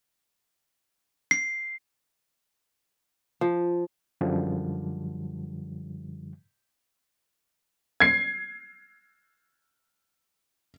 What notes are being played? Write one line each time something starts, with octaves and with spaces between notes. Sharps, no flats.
C7
F3
F#2 D3 F3 G3
G#6 C7